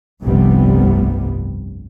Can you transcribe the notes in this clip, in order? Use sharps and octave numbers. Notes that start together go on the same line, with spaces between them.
F1 C2 G2 C3 G3 B3